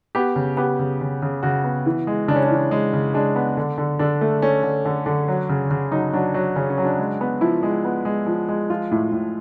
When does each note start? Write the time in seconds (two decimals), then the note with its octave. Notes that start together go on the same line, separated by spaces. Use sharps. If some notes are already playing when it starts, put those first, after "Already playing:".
0.15 B3 G4
0.36 C#3
0.57 B3 G4
0.79 C#3
1.01 C#3
1.22 C#3
1.43 C#3 F#4
1.64 B3
1.86 E3
2.07 G#3
2.28 C#3 D4
2.36 C#4
2.43 D4
2.51 E3
2.71 G#3
2.93 C#3
3.14 G#3 D4
3.36 B3
3.57 D3
3.78 D3
3.99 D3 D4
4.21 A3
4.42 A3 C#4
4.63 D3
4.85 D3
5.06 D3
5.28 F#3
5.49 C#3
5.71 C#3
5.91 F#3 D#4
6.13 F#3 D4
6.34 F#3
6.56 C#3 C#4
6.70 C#4
6.78 F#3
6.85 D4
6.98 G#3
7.21 B3
7.41 F3 E4
7.63 G#3
7.85 B3
8.05 G#3
8.26 F3
8.48 G#3
8.70 F3 F4
8.91 A2
9.12 A2